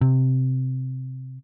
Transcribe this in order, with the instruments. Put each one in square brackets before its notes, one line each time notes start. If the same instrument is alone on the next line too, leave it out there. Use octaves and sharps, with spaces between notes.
[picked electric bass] C3